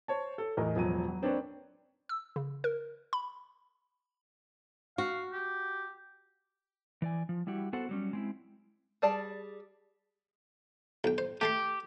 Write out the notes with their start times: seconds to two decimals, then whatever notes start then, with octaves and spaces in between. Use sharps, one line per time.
0.08 C5 C#5 A5
0.38 A4
0.57 E2 A2 A#4 D#5
0.75 E1 F3 F#3 D#7
1.08 F#3
1.22 A#3 C4 D4 B4 C#5 D5
2.09 E6
2.36 C#3
2.64 A#4
3.13 B5
4.98 F#4 F5
5.33 G4
7.02 E3 D5 G#5
7.29 F3
7.47 G3 E4 F#4 G4
7.73 B3 F#4 A4 C5 F#5
7.89 F#3 G3 C#4
8.13 G#3 C4 E4
9.02 G3 G#4 D5 A5
11.04 B1 G5
11.18 C5
11.41 A3 G4 A4 C6